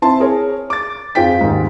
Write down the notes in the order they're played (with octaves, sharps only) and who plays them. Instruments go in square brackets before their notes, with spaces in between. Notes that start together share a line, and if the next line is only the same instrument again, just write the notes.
[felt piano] C4 E4 A5 C6
G#4 A#4 C#5
D6 A6
F2 F4 G#4 G5 B6
D#2 G#2